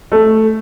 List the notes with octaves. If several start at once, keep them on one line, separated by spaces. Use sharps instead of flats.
A3